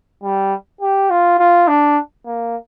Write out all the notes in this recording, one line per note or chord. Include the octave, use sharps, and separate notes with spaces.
G3
G4
F4
F4
D4
A#3